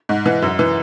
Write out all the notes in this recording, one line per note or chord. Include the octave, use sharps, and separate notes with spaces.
G#2
E3
F#2
E3